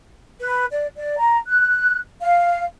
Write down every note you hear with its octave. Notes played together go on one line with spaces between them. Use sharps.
B4
D5
D5
A#5
F#6
F5